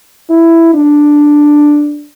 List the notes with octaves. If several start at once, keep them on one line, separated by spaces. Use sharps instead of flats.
E4
D4